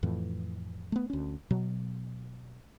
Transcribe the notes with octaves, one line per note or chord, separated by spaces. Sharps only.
F2 A2 E3
A3 B3
D2 C#4
B2 F#3